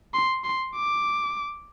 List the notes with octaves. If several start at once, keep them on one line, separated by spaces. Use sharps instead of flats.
C6
C6
D6